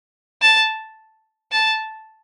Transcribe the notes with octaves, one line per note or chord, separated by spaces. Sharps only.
A5
A5